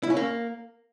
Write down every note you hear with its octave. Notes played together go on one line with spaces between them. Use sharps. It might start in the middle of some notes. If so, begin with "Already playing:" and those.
E4
C#4
A#3